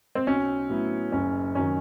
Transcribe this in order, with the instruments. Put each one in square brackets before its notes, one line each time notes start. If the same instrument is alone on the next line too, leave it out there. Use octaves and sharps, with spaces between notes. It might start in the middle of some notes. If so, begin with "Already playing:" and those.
[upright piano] C4
[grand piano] B1 [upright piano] C#4
[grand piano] A2 F#3 B3 E4
[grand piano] F#1 [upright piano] C#4
[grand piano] F#2 D#3 [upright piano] C#4